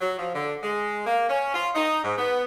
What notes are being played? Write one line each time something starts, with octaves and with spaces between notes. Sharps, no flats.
F#3
F3
D3
G#3
A#3
C#4
F4
D#4
G#2
B3